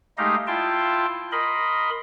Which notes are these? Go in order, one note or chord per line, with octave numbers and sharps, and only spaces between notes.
G#3 A3 D#4 G4 D#5 F5
E4 F4 G5 A5 C6
A#4 D#5 B5 C6